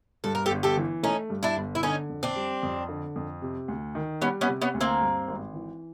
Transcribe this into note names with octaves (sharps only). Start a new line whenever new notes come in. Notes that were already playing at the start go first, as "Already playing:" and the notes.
G2 A4
A#4
G4 A4
G1
G4 A4
E3
A3 C#4 D#4
G2
D4 E4
G1
E4
D3 C#4 D#4
F2
C4 D4
G3
F2
D3
F2
C3
D2
D#3
G3 B3 C#4
B3 C#4
C3
B3 C#4
D2
A#3 C4
G2
G#1
E3